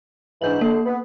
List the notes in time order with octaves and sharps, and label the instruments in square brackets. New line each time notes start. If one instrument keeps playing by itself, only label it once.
[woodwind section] G#2 E3 [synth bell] D4 G6 F#7
[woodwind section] D3 [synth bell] A#3
[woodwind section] B3